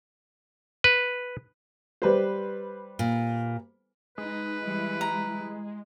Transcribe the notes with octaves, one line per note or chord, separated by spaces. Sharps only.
B4
G3 B4 C5
A#2
G#3 D#4 B4
E3 G3 E4
A#5